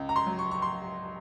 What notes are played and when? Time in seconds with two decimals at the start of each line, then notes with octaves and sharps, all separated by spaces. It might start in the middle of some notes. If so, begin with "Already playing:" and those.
Already playing: C#2
0.09 A#5
0.16 C6
0.27 F#3
0.39 C#6
0.51 C#6
0.62 C6